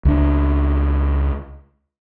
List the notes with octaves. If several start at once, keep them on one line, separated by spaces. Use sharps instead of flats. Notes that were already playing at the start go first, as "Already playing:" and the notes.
C#2 D4